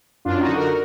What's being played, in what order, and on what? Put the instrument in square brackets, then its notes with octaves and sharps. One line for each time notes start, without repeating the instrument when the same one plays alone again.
[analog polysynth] F#2 D4 F4
D#4 F#4
D3
F#4 A#4